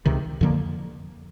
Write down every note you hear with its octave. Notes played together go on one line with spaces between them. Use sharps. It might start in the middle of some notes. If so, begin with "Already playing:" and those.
C#2 C3 D#3
F2 D3 F3 A#3